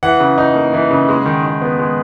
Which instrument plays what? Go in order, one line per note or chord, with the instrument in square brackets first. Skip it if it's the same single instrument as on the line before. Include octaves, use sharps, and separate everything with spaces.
[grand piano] E3 F#5
C#3
D#4
A#3
E3
C#3
G#3
D#3
D#3
B3
G#3